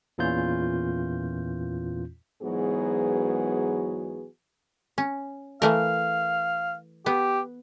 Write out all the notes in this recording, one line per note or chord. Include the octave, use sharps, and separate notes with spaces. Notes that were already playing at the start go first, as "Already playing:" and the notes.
E2 A#2 E3 C#4 F4 G6
G#2 E3 F#3 B3 F#4 G#4
C#4
E3 A3 A#4 F5
B3 G4